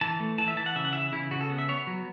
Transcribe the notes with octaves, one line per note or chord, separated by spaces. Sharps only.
E3 A5
A3
E3 A5
E5
E3 A5
F#5
C#3 E5
F#5
E3 E5
C#3 E4
C#3 F#4
A4
B3
E5
B3 C#5
F#3